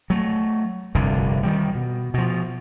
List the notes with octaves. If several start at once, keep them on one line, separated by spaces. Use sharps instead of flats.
F#3 A3
F1 C2 G2 D3
D#3 E3 G3
B2
B2 F3